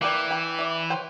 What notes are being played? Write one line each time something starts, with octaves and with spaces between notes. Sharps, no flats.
E3 A#3 G4 D5
G5 B5
E4 D5
F#3 C5 G5